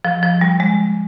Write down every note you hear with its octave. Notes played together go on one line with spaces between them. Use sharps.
F3
F3
G3
G#3